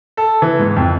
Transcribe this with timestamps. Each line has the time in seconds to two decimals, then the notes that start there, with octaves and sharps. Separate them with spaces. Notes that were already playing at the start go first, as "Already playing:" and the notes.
0.17 A4
0.42 E3
0.59 G#2
0.76 F2